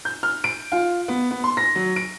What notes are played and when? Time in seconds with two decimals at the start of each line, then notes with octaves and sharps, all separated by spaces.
0.05 G6
0.23 F6
0.44 D7
0.72 F4
1.08 B3
1.31 B3
1.44 C6
1.57 A#6
1.76 F#3
1.96 D7